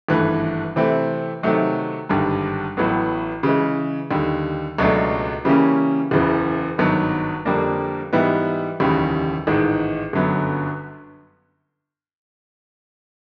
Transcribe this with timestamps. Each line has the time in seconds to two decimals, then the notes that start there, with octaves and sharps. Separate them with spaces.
0.09 G#1 G2 E3 A3
0.76 C3 E3 A3 C4
1.43 C3 D#3 F#3 A3
2.09 G#1 G2 D3 G3
2.77 A1 A2 F#3 B3
3.43 C#3 E3 G#3
4.11 D#2 D3 G3
4.78 C#2 B2 F#3 A3 D4
5.45 C#3 E3 G3 A#3 C#4
6.11 F#1 E2 C#3 E3
6.78 G#1 G2 D#3 F#3 B3
7.45 F2 D3 G3 A#3 D4
8.13 G#2 E3 G3 B3 E4
8.80 F1 D#2 C#3 E3 G3
9.47 A1 G#2 D#3 G#3
10.13 G1 F#2 D3 F#3 B3